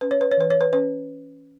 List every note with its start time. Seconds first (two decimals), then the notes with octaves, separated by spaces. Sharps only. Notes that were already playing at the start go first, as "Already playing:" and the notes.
0.01 C#4 B4
0.11 C#5
0.21 B4
0.31 C#5
0.37 E3 B4
0.50 C#5
0.61 B4
0.73 C#4 B4